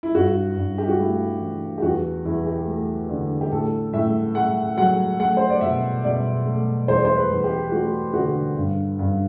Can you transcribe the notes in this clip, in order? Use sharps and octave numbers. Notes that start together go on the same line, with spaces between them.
E4
G2 F#4
G2
G4
F#4
A3 E4
E3
G4
E2 F#4
E2 E4
G4
A3
D3
G4
A2 A4
A2 E5
A3 F#5
F#3 F#5
A3 F#5
C5
D5
B2 E5
B2 D5
A3
E2 C5
D5
C5
B4
E2
G4
A3 F#4
D3 F#4
G2
G2